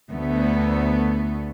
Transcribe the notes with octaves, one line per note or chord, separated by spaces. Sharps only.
D2 A3 B3